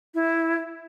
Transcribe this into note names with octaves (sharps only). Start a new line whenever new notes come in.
E4